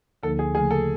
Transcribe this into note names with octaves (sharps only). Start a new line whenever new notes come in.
D2 D3 F3 A#3 D#4 A4
G#4
C#3 F3 A3 G#4
A4